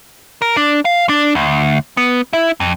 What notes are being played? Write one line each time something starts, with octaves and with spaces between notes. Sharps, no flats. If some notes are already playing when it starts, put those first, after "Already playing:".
A#4
D4
F5
D4
D2
B3
E4
F2